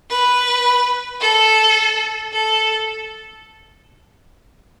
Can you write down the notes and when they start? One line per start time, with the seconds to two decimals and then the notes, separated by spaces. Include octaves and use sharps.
0.10 B4
1.21 A4
2.33 A4